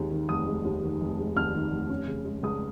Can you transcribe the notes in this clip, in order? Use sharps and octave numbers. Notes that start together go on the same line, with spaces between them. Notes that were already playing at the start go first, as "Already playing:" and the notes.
Already playing: D#2 G#3
D#3
F1 D#6
G#3
D#2
D#3
F1
G#3
D#2 F6
D#3
F1
C#4
C#3
G#3
C#2 D#6